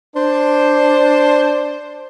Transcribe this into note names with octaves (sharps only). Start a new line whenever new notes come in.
D4 C5